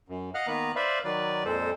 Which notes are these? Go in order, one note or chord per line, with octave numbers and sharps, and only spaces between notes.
F#2
D#5 F5 F#5 F6 F#6
D#3 A#3 B3 B4 A#5 F#6
B4 C5 D5 E5 F5 B5
D#3 F#3 B4 D5
F2 A#2 G#3 A4 C5